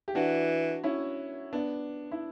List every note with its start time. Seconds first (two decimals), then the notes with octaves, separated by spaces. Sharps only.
0.08 G4
0.15 E3 D4 F#4
0.84 C#4 E4
1.53 B3 D4
2.12 E4